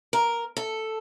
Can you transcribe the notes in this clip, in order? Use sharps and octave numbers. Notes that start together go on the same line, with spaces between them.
A#4
A4